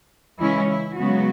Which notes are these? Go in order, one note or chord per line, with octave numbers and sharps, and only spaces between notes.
C#3 E3 G#3 C#4 E4
E4
C#3 F#3 G#3 B3 F#4